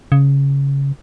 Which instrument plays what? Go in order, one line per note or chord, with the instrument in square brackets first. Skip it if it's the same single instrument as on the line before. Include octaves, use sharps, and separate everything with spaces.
[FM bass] C#3